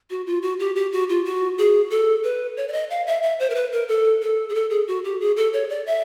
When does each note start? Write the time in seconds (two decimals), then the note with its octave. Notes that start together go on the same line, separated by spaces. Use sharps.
0.10 F#4
0.27 F4
0.42 F#4
0.60 G4
0.76 G4
0.92 F#4
1.09 F4
1.25 F#4
1.58 G#4
1.90 A4
2.24 B4
2.57 C#5
2.68 D5
2.73 D#5
2.90 F5
3.07 E5
3.23 E5
3.40 C5
3.50 A#4
3.55 B4
3.72 A#4
3.88 A4
4.22 A4
4.49 G#4
4.55 A4
4.70 G#4
4.88 F#4
5.04 G4
5.21 G#4
5.36 A4
5.53 C#5
5.70 D5
5.86 E5